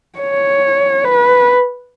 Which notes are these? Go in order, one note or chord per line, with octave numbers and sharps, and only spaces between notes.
C#5
B4